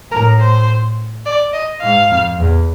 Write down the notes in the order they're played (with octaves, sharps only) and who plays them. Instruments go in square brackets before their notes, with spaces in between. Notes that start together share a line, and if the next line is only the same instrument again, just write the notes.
[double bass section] A2 [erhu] A#4
[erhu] C5
D5
D#5
[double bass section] G#2 [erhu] F5
[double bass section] F2
E2